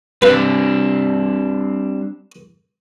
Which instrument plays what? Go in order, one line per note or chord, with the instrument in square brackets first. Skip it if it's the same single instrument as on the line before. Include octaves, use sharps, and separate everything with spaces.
[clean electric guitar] G3 C4 D4 [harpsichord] B4 F5